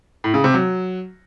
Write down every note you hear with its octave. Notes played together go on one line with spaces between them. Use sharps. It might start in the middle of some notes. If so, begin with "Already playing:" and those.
A2
C#3
C3
F#3